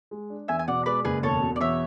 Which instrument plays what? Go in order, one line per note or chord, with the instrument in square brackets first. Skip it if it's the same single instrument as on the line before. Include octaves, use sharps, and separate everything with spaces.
[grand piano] G#3
D4
[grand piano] E2 [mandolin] E5 G#5
[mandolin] G#5
[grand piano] B2 [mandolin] D5 F#5
[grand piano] G#3 [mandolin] B4 D5
[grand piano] F#1 [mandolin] G#4 B4
[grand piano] E1 [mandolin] A4 C#5
[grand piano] B2
[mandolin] D5
[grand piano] E2 [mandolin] C#5 E5